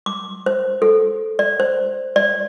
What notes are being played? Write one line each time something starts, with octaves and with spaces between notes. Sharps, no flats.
D6
C5
A4
D5
C5
D5